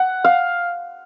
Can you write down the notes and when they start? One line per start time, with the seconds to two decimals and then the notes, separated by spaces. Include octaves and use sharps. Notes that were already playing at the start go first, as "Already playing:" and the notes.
Already playing: F#5
0.24 F5